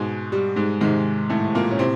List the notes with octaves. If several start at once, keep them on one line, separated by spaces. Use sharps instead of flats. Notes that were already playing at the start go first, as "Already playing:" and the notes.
Already playing: G#2 B2 G#3
G3
G#2 G#3
G#2 C3 D#3 G#3
A2 A3
A#2 A#3
C#4
A2 C3 C4